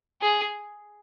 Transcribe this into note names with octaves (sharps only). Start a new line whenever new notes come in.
G#4